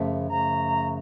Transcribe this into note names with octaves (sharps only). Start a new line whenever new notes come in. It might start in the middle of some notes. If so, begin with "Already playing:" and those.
Already playing: F#2 C#3 F3 A3
F#2 C#3 F3 A3 A#5